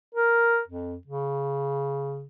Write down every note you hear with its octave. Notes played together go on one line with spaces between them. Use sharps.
A#4
F2
C#3